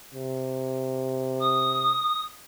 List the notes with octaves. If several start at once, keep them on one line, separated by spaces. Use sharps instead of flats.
C3
D#6